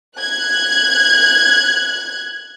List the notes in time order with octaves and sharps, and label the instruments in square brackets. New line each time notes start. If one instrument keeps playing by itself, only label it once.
[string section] F#6 G#6